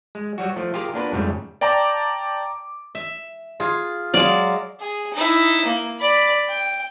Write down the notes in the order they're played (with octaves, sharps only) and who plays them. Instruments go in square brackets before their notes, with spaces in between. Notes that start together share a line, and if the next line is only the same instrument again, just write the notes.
[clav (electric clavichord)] G#3
F#3 G3 F#4
F3 A3
F4 G4 G#4 A#4
A#3 B3 D4 F4 A#4 B4
F2 G#2 C#3 G3 A3
[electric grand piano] D5 G5 A5 A#5 D6
[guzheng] E5
F4 G#4
[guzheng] F#3 G#3 [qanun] D5 F5
[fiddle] G#4
D#4 E4
A#3
D5 B5
G5